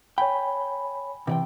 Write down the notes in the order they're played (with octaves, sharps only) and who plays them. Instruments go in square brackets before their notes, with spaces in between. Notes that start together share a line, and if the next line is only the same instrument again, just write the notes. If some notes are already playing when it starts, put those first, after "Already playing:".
[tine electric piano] C#5 G#5 B5 [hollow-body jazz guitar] G5
[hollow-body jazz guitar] C3 D5 G5 [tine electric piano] E3